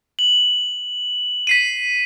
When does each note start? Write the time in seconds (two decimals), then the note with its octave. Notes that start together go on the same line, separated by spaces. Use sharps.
0.19 F#7
1.47 B6 C7 D#7